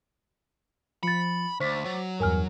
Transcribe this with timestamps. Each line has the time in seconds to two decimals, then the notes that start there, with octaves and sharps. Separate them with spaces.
1.03 F3 B5 A6 C#7
1.60 D2 C5 C#6 D6 A6 B6
1.85 F#3
2.20 E2 G2 A#4 G#5 F6